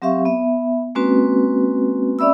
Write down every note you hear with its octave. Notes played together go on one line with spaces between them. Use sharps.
F#3 C4 G4 E5 F5 C#6
B3 E5
G#3 A#3 C4 C#4 F#4 B4
C#4 D5 E5 B5 E6